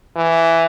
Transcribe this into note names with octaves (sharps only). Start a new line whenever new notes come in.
E3